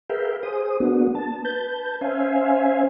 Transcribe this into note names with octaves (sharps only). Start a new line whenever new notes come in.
G#4 A#4 B4 E5 F5 G5
G#4 C5 D#6
A#3 B3 D4 F#4
A5
B4 A5 G6
C#4 C5 E5 F5 G#5